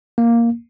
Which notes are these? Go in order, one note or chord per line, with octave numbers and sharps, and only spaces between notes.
A#3